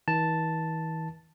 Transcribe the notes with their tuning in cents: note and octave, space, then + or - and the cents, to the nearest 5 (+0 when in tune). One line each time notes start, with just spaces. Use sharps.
E3 -45 A5 +0